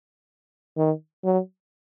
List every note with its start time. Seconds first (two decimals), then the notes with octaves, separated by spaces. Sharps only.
0.77 D#3
1.24 F#3